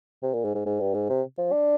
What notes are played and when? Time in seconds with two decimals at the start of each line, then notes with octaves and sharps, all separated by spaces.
0.23 C3
0.34 A#2
0.45 G#2
0.55 G#2
0.66 G#2
0.80 G2
0.94 G#2
1.09 C3
1.38 F3
1.52 D4